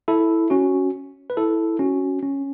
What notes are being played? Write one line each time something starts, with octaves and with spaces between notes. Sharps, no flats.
E4 A4
C#4 F#4
B4
E4 A4
C#4 F#4
C#4